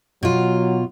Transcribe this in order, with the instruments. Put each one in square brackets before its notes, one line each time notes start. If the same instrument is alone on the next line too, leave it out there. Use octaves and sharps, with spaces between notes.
[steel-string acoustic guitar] B2 F4 [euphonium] F#3